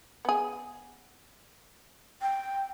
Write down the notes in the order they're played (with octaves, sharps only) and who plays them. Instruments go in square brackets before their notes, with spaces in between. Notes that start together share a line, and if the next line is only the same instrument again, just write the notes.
[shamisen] B3 G#4
[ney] G5